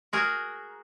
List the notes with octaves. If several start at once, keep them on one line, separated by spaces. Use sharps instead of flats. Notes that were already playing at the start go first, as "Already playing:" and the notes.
F#4 G#4 A#4